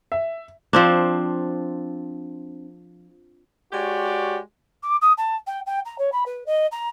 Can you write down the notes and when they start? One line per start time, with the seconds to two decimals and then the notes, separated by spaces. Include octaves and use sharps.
0.12 E5
0.73 F3 C4 D4
3.72 G#3 F#4 G4 C#5 D5
4.83 D6
5.01 D#6
5.17 A5
5.47 G5
5.66 G5
5.85 A#5
5.98 C#5
6.12 B5
6.26 B4
6.46 D#5
6.71 A#5